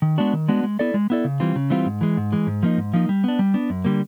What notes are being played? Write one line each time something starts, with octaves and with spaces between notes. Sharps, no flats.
D#3
G#3 B3 D4 F#4
D#3
G#3 B3 D4 F#4
G#3
B3 E4 A4 D5
G#3
B3 E4 A4 D5
C#3
E3 G3 C4 F4
C#3
E3 G3 C4 F4
G#2
E3 G#3
G#2
E3 G#3
G#2
F3 A#3 D#4
G#2
F3 A#3 D#4
G3
B3 D4
G3
B3 D4
F#2
D3 G3 A#3